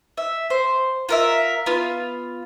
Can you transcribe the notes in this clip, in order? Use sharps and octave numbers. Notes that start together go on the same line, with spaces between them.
E5
C5
F4 A#4 E5
B3 F4